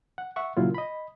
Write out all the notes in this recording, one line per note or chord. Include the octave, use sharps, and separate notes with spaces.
F#5
E5 F#5 C#6
A#2 C#3 F#3 E4 F4
D#5 B5